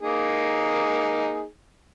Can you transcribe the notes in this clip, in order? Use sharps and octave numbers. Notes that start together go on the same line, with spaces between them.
A#3 D#4 G#4